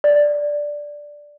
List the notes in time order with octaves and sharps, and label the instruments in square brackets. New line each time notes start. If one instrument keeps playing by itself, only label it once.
[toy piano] D5